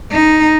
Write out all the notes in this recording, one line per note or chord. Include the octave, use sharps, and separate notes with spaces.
D#4